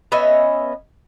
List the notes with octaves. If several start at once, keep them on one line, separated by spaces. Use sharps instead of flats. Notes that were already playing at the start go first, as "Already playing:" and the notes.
B3 C#4 D#5 E5